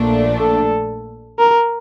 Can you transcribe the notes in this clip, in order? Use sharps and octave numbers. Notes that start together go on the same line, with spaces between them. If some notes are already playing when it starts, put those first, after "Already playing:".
Already playing: A#1 A#2 A3 D4
A4
A#4